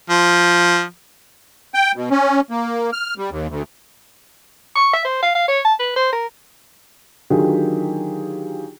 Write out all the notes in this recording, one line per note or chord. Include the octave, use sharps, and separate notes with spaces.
F3
G5
B2
C#4
A#3
F6
G3
D#2
D2
C#6
E5
C5
F5
F5
C#5
A5
B4
C5
A#4
D3 D#3 F#3 F4 G4 G#4